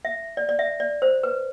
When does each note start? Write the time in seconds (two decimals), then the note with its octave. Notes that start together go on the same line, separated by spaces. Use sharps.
0.05 E5
0.37 D5
0.49 D5
0.59 E5
0.80 D5
1.02 C5
1.23 B4